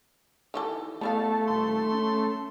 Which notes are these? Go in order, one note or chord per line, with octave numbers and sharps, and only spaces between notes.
D#3 E3 A4
A3 B3 E4 F5 A5
D#1 C6
C#4